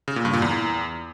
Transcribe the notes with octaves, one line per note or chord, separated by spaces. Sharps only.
C#3
A#2
G2
A#2
E2